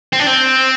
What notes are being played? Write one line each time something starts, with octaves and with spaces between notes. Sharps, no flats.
C4
D4
C4